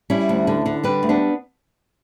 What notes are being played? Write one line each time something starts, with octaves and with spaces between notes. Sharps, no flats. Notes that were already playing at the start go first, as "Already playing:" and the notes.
G3 C#4 E4
D2
D3
D3
G3 G4 B4
D2
B3 D4